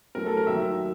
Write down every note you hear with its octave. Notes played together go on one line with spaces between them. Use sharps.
A2 F#3 A3 A#4
A4
A#4
D#2 D#3 F#3 E5